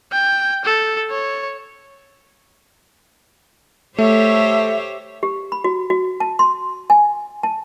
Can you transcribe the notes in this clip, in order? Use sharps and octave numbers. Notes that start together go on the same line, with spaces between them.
G5
A4
C#5
A3 G4 C5 C#5 E5
G4
B5
F#4
F#4
A5
C6
G#5
A5